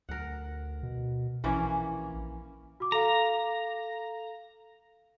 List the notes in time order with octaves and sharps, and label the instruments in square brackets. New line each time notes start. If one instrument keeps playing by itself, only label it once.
[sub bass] D2 [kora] A#4 F#5
[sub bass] B2
[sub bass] A#1 [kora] E3 A#3 C#4
[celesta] F#4 D6
[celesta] A4 F5 [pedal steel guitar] A#5